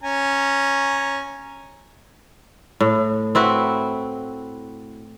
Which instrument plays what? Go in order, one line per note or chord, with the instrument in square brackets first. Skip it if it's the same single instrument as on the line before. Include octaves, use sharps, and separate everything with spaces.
[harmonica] C#4 G#5 A#5
[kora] A2
C4 E4 F#4 B4